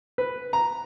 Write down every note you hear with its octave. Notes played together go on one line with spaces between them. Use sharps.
B4
A#5